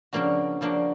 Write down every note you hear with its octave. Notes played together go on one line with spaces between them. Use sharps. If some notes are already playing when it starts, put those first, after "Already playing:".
C#3 F3 A#3 D4 F#4
C#3 F3 A#3 D4 F#4